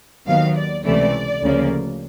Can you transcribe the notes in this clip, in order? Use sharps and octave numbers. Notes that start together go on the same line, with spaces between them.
D#2 D#3 F#3 B3 F5
D5
C#2 C3 E3 A3 D5
D2 C#3 F3 A#3